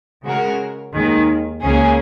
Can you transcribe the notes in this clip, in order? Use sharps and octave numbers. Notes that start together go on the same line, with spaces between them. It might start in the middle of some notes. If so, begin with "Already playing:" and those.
C#3 G#3 F#4 A#4
D#2 D#3 G#3
C#2 C#3 A#3 C#4 G#4